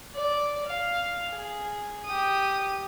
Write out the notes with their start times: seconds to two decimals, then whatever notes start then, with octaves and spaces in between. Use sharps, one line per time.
0.15 D5
0.67 F5
1.30 G#4
2.06 G4 D#6